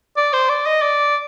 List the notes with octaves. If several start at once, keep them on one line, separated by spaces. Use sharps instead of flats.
D5
C5
D5
D#5
D5